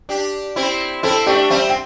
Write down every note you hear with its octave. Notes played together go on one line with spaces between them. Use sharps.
D4 G4
C4 E4
C4 E4 A4
A3 D4 G4
G3 C4 E5
G5